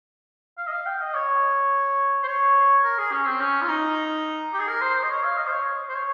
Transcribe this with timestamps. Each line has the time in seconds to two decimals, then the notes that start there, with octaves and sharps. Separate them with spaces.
0.58 F5
0.67 D#5
0.72 F5
0.86 G5
1.01 D#5
1.15 C#5
2.23 C5
2.27 C#5
2.84 A#4
2.98 G#4
3.12 C#4
3.26 C4
3.41 C#4
3.62 F4
3.69 D#4
4.53 G4
4.60 G#4
4.68 A#4
4.81 C5
4.95 C5
5.03 D#5
5.10 C#5
5.23 F5
5.38 D#5
5.47 C5
5.51 C#5
5.89 C5
5.95 C#5